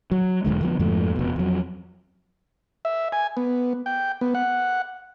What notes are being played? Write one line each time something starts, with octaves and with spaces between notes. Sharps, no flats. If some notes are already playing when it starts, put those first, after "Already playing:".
F#3
E1 C#2 D3 G#3
D3 F3 B3
F2 G#2 F3 A3
F1 B2
F2 F#3
E5
G#5
B3
G5
B3
F#5